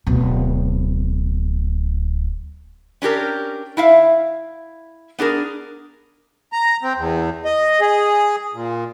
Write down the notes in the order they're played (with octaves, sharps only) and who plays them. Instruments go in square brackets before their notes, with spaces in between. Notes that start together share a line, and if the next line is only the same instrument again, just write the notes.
[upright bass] D1 B2
[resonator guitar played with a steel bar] C#4 D4 G4 A#4
E4 E5 F5
B3 D4 G#4 A#4
[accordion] A#5
C4
E2
D#5
G#4
A#2